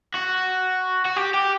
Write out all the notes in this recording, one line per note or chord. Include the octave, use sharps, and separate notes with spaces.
F#4
F#4
G4
G4